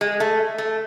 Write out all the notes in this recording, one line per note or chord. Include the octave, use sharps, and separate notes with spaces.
G#3
A3
A3